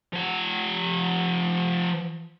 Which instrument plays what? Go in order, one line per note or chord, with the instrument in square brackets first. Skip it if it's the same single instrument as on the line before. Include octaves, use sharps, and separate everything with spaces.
[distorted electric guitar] F3 F#5